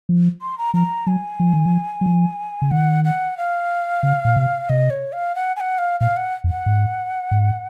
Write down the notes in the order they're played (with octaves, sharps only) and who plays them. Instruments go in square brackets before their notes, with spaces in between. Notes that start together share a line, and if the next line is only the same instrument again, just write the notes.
[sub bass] F3
[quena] C6
A#5
[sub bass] F3 [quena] A#5
[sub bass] F#3 [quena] G#5
[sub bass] F3
D#3
F3
F#3
F3
C#3
[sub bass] D#3 [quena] F#5
[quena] F#5
F5
[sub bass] C#3
A#2
C3
[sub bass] C3 [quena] D#5
[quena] C#5
F5
F#5
G#5
F#5
F5
[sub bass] A#2 [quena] F5
[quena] F#5
[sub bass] F2
[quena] F#5
[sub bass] G#2
G#2